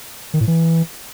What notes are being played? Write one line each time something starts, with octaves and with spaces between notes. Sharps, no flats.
D#3
A2
E3